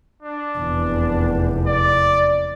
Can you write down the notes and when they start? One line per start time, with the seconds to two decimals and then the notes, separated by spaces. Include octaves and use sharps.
0.22 D4
0.57 F1 E2
1.66 D5